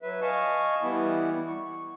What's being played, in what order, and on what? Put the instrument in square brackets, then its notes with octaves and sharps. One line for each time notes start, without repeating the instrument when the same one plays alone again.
[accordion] F#3 B4 E5
D#5 F5 G#5 A5 C#6
E3 G3 B3 E4
C#6